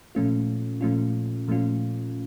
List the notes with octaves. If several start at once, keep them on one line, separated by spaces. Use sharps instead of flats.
A#2 F3 A3 C#4 F4
A#2 F3 A3 C#4 F4
A#2 F3 A3 C#4 F4